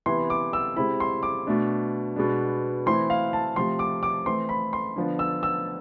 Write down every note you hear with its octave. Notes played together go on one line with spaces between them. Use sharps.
C3 E3 B3 E4 C6
D6
E6
C3 G#3 C4 E4 B5
C6
D6
B2 A3 D4
B2 G#3 B3 D4
E3 A3 C4 E4 C6
F5
A5
C3 F3 A3 C6
D6
D6
E3 A3 C4 E4 C6
B5
C6
D3 F3 B3
E6
E6